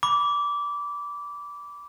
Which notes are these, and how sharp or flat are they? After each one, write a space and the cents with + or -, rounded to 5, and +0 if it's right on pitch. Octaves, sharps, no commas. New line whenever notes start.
B5 +0 D6 -20